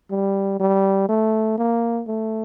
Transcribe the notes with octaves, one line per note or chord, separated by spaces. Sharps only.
G3
G3
A3
A#3
A3